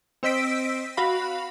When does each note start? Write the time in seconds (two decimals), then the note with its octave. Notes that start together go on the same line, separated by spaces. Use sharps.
0.23 C4 C5 D#5 E6 B6 D7
0.97 F#4 F5 B5